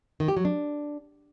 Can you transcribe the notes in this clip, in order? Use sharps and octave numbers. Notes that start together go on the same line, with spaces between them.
D#3
G4
F#3
D4